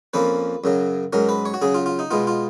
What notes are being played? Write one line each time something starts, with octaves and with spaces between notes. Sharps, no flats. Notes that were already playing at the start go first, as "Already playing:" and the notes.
F2 F3 A#3 C#4 B4
F#2 C#3 F#3
G#2 F#3 C#4 A#4
B4
C#5
F#4
C#3 F#3 C#4 G#4
F4
F4
D#4
B2 G#3 B3 F4
F4